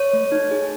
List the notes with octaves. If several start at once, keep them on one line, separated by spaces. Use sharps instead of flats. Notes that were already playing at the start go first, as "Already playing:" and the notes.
Already playing: C#5
A3
D#4
G#4